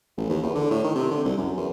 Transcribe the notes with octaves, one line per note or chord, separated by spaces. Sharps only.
A1
D#2
E2
D3
A2
D#3
C3
D3
C2
F#2
E2